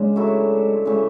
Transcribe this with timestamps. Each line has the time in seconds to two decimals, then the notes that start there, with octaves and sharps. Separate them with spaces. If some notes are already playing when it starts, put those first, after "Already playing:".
Already playing: C#3 G#3 D4
0.16 F#3 A3 E4 A4
0.85 C#3 E3 G#3 A3